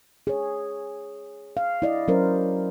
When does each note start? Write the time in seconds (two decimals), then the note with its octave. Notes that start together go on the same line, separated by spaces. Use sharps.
0.27 G#4 C#5
1.57 F5
1.82 E4 D5 D#5
2.08 F#3 C#4 A#4 C5